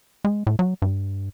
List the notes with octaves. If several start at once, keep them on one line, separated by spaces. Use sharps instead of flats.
G#3
A2
F#3
G2